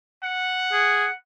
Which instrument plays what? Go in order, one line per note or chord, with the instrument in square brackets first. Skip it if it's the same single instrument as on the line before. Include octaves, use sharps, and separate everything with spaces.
[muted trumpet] F#5
[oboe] G#4